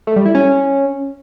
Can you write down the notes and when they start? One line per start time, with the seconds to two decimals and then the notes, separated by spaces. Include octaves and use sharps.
0.07 A3
0.16 G3
0.26 E4
0.35 C#4